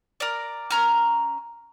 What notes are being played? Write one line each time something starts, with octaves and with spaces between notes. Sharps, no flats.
A#4 D5
C#4 A#5 F6